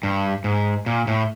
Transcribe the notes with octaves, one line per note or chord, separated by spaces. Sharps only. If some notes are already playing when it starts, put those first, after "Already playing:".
G2
G#2
A#2
A2